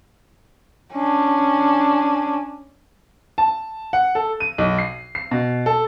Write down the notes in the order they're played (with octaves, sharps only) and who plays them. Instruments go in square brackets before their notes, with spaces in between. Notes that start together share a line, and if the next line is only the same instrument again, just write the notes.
[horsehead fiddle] C#4 D4
[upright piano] A5
F#5
A4
D#7
B1
C7
C7
B2
A4